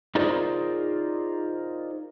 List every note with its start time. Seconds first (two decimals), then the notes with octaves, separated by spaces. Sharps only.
0.15 D#4 F4 G#4 A#4 C5 D5